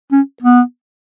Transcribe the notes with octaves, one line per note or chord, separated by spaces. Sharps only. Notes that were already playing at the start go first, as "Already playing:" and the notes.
C#4
B3